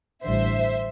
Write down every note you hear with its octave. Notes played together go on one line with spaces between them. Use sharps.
A1 G2 D3 C5 E5